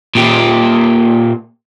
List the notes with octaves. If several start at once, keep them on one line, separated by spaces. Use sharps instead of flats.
A#2 G4